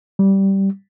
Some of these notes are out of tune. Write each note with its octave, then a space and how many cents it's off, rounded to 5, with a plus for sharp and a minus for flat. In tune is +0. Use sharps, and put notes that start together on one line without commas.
G3 -10